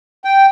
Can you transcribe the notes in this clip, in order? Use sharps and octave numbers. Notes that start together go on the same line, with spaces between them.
G5